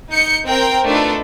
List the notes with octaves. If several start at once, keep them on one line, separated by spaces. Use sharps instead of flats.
D#4 G6 C#7
C4 A#4 G5
A3 D4 D#4 F4 A4 B4